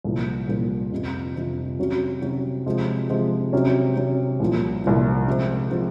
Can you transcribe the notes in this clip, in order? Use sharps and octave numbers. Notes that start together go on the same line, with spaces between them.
C2 A#2 F3
C2 A#2 F3
F2 C3 F3
F2 C3 F3
C3 F#3 C#4 F#4
C3 F#3 C#4 F#4
C3 F3 G#3
C3 F3 G#3
C3 F#3 C#4
C3 F#3 C#4
C2 A#2 F3
C2 A#2 F3
C3 F3 G#3 C4
C3 F3 G#3 C4